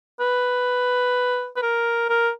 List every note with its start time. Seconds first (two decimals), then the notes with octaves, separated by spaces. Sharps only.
0.20 B4
1.57 B4
1.62 A#4
2.10 A#4